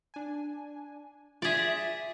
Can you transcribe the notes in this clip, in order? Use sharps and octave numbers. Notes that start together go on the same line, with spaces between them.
D4 G#5
F4 G#4 D5 E5 E7